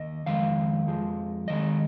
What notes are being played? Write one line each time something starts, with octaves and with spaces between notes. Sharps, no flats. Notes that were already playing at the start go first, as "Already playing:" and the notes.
Already playing: D#2 D#5
F2 D#3 G#3 F5
F2 F3 G#3
D#2 D#3 G#3 D#5